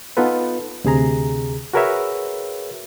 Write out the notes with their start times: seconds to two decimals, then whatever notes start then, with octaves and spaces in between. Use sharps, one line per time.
0.17 B3 D#4 F4 A4 B4
0.84 D2 C3 G#4 A#5
1.73 F#4 G#4 A#4 B4 C#5 E5